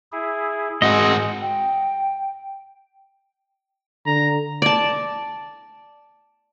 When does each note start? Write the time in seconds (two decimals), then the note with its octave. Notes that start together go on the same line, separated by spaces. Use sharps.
0.12 E4 G#4
0.82 G#2 C4 F#4 G#4 D#5
1.42 G5
4.06 D3 A#5
4.62 D5 A5